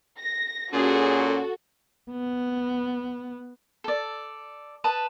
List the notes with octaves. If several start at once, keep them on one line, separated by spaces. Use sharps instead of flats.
A#6
A#2 C#4 F#4 G#4 A4
B3
A4 D5
B4 A5 D#6